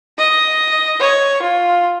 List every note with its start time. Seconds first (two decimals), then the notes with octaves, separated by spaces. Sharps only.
0.19 D#5
1.00 C#5
1.42 F4